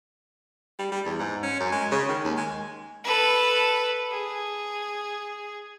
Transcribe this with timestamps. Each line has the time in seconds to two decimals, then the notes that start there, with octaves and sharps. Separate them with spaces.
0.79 G3
0.92 G3
1.05 E2
1.19 G#2
1.43 C#4
1.60 F#2
1.72 G#3
1.91 C#3
2.09 D#3
2.25 D#2
2.37 G#3
3.04 A4 B4
4.11 G#4